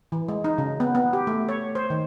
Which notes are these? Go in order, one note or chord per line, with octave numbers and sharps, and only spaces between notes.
E3
G#3
D#4
C#3
B3
B3
G4
A3
C#5
C5
D#3